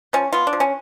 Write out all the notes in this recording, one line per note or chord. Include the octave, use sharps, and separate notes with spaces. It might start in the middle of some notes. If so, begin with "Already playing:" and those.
F3 C#4
B3 F4
D4
F3
C#4